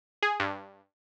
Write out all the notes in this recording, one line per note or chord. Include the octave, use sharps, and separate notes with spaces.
G#4
G2